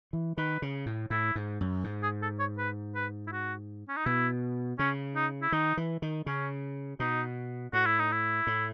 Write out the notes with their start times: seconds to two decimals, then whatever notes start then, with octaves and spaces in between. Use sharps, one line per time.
0.13 E3
0.38 D#3 B4
0.62 C#3
0.86 A2
1.10 A2 E4
1.35 G#2
1.61 F#2
1.84 G#2
2.03 G#4
2.22 A4
2.39 C#5
2.58 B4
2.95 B4
3.27 E4
3.32 F#4
3.88 C#4
3.97 D#4
4.05 B2 E4
4.79 C#3 C#4
5.16 D#4
5.42 E4
5.52 D#3 D#4
5.77 E3
6.02 D#3
6.26 C#3 C#4
7.00 B2 D#4
7.73 A2 F#4
7.86 E4
7.99 D#4
8.12 E4
8.47 A2